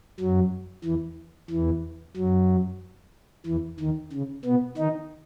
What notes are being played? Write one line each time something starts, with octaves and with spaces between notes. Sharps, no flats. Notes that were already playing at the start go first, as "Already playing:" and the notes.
F#2 F#3
E2 E3
E2 E3
F#2 F#3
E2 E3
D#2 D#3
C#3
B2 B3
D#3 D#4